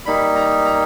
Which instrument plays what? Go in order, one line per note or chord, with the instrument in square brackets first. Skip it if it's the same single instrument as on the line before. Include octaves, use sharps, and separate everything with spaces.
[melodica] G3 A#3 D#4 B5
A#5
A#5